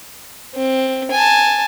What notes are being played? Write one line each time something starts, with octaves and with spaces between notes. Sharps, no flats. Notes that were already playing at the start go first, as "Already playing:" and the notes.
C4
G#5 A5